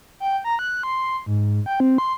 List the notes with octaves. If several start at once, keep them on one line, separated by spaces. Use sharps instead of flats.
G5
A#5
F#6
C6
G#2
G5
C4
C6